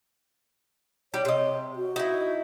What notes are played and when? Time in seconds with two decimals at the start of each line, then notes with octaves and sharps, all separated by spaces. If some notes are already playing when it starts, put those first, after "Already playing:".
1.14 G3 G4 C#5
1.25 C3 D#5
1.76 F#4
1.96 D#4 E4